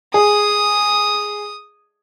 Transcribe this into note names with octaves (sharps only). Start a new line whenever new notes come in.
G#4 D#6